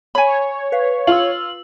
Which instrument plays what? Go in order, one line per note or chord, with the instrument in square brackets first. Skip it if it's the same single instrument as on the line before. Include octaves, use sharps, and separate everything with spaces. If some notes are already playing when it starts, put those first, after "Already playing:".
[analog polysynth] C#5 [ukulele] G#5 B5
[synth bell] B4 F5
[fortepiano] F4 [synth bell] E6 F#7